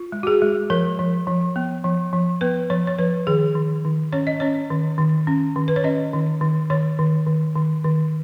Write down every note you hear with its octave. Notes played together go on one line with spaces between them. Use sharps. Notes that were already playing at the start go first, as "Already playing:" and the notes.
Already playing: F4
G#3
F#4
G#4
G#3
F3 A#4
F3
F3
B3
F3
F3
B3 B4
F3 C#5
C#5
F3 B4
D#3 G#4
D#3
D#3
C#4 C#5
D#5
C#4 C#5
D#3
D#3
C#4
D#3
B4
C#5
C#4 D#5
D#3
D#3
D#3 C#5
D#3
D#3
D#3
D#3